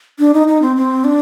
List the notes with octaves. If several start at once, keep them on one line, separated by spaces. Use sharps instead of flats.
D4
D#4
D#4
C4
C4
D4